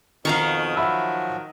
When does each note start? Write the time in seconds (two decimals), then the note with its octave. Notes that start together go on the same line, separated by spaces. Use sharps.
0.25 F2 B2 D#3 F5 A#5 C#6 D#6
0.76 F3 F#3 F#4 E5 B5 E6